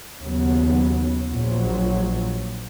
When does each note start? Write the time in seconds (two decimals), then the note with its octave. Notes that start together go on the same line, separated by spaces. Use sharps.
0.19 D#2 C#3 F#3 B3
1.31 A#1 A#2 F#3